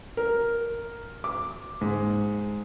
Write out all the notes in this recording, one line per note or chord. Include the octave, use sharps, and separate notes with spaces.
A#4
D6
G#2